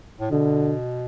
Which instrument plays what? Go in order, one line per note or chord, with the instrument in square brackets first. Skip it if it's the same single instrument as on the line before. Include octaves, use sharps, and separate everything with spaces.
[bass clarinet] A2
[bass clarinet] B2 [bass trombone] D3